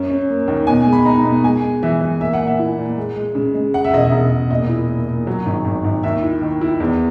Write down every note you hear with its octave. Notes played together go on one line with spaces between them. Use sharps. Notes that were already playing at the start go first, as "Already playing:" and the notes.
Already playing: F#2 C#4
C#4
A#3
D#2
B2 G#5
G#3
B5
D#4 A#5
B2
G#3 G#5
G#3
E3 E5
E3
A#3 E5
F#5
A#2
E5
E4
A#2
G#3
G#3
C#3
G#3
C#3 F#5
E5
E1 D#5
E5
E1
E1
A#2 D#5
E4
A#2
A#2
F#3
G#1
G#1
G#1
D#2 E5
E4
D#3
E4
E2